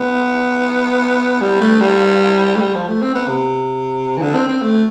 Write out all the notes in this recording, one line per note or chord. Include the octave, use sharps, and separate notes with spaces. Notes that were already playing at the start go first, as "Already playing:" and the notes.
Already playing: B3
G3
A3
G3
A3
G3
F3
A3
C4
B3
C3
E3
D3
C4
C4
A3